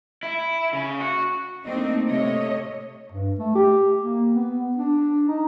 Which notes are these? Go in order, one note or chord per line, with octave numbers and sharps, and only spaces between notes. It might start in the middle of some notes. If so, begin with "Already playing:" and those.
E4
C#3
F#4
A3 A#3 C4 D4 D#4
C3 A3 C#5 D#5
G2
A3
G4
A#3
B3
D4
D#4